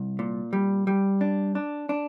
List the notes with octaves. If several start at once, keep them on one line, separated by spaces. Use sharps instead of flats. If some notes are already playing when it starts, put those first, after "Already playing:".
Already playing: C2
A#2
G3
G3
D4
D4
D4